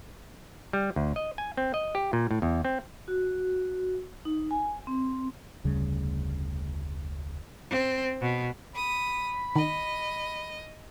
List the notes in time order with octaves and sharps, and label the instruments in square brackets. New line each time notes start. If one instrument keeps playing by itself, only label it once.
[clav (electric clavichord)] G3
D2
D#5
G#5
C4
D#5
G4
A#2
A2
E2
C4
[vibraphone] F#4
D#4
G#5
C4
[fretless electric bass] F1 D2 C#3 G3
[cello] C4
B2
[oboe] B5 [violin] D#6
[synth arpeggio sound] D#3 [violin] D#5